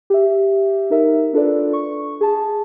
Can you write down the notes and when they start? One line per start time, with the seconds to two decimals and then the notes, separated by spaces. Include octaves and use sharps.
0.10 G4 E5
0.90 D#4 A#4 E5
1.33 D4 F4 A4 B4 D5
1.73 C#6
2.21 G#4 A5